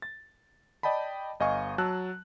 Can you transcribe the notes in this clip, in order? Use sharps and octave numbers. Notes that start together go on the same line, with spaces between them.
A6
D5 D#5 G5 A5 B5
G1 D#5 F5 G#5 C#6
F#3 A5 E6 F#6